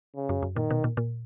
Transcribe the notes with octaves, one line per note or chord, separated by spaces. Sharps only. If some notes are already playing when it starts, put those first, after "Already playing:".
C#3
F#2
F#2
A#2 D#3
B2
A#2
A#2